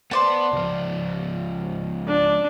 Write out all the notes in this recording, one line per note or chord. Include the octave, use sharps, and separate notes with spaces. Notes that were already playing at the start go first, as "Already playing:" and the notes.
B3 B4 C5 D5 A5
C#2 F3
D4